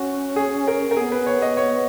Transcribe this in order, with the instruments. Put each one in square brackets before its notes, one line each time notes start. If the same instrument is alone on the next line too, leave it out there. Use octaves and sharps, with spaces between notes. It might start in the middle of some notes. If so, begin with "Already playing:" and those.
Already playing: [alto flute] C#4 [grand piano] F#4
[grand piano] G#4
A#4
A#4
[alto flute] B3 [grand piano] G#4
[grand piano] B4
C#5
D#5
C#5